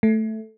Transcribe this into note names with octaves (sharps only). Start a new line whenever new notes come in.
A3